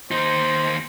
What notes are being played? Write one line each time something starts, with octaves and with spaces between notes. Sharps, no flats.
D#2 D#4 C5